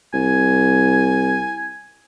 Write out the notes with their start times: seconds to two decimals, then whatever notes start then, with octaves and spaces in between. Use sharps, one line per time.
0.14 C2 G#5